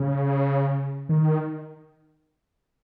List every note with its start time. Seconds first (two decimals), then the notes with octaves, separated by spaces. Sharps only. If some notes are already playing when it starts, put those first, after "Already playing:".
Already playing: C#3
1.09 D#3